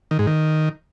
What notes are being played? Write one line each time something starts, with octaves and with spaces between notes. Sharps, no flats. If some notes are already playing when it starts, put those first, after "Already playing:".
D#3
G#2
D#3